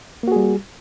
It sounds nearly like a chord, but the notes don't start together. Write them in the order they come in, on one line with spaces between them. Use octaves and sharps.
A#3 F#4 G#4 G3